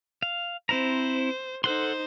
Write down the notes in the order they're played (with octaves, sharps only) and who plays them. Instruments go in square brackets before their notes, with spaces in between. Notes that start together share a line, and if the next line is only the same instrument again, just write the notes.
[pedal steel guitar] F5
[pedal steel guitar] C4 E4 A#5 [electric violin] C5
[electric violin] D#4 C5 [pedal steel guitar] A4 F#5 C6